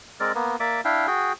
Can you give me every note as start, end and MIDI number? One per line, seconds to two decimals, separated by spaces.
0.20 0.32 56
0.20 0.32 60
0.20 0.32 70
0.20 0.32 74
0.35 0.56 58
0.35 0.56 59
0.60 0.81 58
0.60 0.81 74
0.60 0.81 76
0.60 0.81 86
0.85 1.07 62
0.85 1.07 64
0.85 1.07 77
0.85 1.07 79
1.07 1.33 66
1.07 1.33 68
1.07 1.33 79